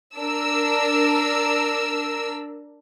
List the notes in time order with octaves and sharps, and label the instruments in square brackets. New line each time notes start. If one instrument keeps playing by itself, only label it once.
[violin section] D4 A#4 E6